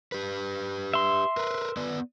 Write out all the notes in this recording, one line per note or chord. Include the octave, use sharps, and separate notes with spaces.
G4 B4
E5 C6
A#4 B4
B3 B4 D5